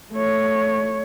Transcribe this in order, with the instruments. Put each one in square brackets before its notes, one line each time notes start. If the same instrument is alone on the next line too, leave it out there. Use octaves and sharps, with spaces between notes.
[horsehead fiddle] A3 C#5